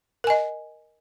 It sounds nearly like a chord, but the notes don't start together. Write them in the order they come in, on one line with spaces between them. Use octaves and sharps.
A#4 G#5 D#5